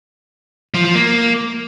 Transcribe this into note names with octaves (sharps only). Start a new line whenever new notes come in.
F3
F3
A#3